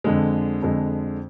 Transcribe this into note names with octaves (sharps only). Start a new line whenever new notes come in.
F2 D3 G#3
F2 D3 G#3